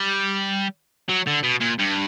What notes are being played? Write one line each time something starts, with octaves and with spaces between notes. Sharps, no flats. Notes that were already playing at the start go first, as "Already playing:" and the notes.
Already playing: G3
F#3
D3
B2
A#2
G2